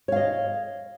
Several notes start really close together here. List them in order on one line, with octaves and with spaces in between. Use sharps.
C#5 F5 D#5